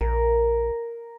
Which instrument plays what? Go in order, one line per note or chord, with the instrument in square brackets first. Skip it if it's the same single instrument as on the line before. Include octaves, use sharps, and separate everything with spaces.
[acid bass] A#1 [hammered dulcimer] A#4